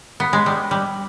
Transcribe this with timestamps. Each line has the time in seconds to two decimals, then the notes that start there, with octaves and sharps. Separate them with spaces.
0.20 B3
0.33 G#3
0.46 G3
0.71 G3